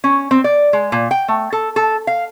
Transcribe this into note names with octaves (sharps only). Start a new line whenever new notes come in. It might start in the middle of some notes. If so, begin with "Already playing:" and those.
C#4
C4
D5
G#3
A#2
G5
A3
A4
A4
F5